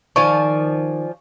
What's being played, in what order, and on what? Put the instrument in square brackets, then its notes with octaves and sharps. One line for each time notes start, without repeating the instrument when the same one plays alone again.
[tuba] D#3 [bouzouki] F3 D5 G#5 [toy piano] C#6